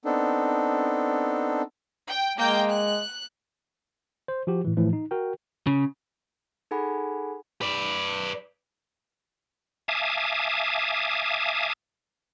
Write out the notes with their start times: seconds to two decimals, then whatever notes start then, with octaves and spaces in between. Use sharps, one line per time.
0.05 B3 C4 D4 D#4 A4
2.09 G5
2.38 G#3 A#3 G5 G6
2.69 F#6
4.28 C5
4.47 F3 F#4 G4
4.65 A2 E3
4.77 A2 E3 F3 A3
4.93 D#4
5.11 F#4 A#4 G5
5.67 C#3
6.71 D#4 G#4 A4 F#5 G#5 B5
7.61 B4 D5
9.88 E5 F5 G#5 A5 D6 D#6